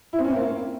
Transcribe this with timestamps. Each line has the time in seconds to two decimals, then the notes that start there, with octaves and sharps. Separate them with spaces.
0.13 E4
0.19 C4
0.24 C#4
0.30 C4
0.36 A#3